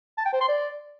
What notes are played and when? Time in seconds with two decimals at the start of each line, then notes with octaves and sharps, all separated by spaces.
0.18 A5
0.26 G5
0.33 C5
0.41 C6
0.49 D5